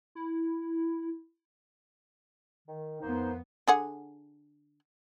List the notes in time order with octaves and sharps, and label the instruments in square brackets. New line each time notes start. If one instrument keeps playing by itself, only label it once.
[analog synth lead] E4
[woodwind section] D#3
[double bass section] F2 B3 [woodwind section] A#3 D#4 C5
[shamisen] D3 G#4 F#5